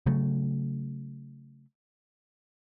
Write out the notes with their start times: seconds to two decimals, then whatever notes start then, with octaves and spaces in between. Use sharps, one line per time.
0.06 C#3 F#3 A3